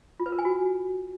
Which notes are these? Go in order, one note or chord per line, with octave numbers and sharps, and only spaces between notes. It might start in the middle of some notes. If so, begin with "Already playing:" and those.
F4
B4
A#4
G#5
F#4